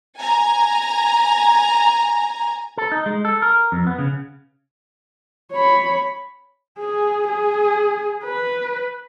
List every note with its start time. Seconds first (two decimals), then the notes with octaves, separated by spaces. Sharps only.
0.19 G#5 A#5
2.77 A4
2.92 D#4
3.06 G#3
3.25 A4
3.42 A#4
3.72 F2
3.87 B3
3.99 C#3
5.52 C#5 B5
6.79 G#4
7.28 G#4
8.24 B4